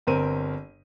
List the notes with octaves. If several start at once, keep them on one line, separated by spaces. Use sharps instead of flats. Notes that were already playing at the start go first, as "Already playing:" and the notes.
G1 C4 A#4 D#7